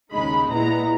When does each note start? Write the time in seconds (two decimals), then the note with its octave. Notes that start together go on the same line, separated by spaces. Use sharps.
0.13 D#2 C#3 G#3 D#4 B5
0.51 A#2 G#3 B3 E4 A#5